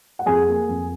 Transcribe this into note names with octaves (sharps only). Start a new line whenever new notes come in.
F#5
F2 G#4 G#5
A#3
F2